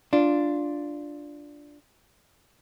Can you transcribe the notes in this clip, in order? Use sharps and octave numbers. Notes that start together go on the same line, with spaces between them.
D4 F4